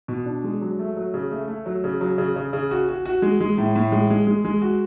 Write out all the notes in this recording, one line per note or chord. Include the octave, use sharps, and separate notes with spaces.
B2
D4
G#3
F#3
A3
F#3
C#3
A3
A3
F#3
C#3
F#3
C#3
C#3
C#3
F#4
F#4
F#4
G#3
G#3
A2
A2
G#3
G#3
G#3
G#3
F#4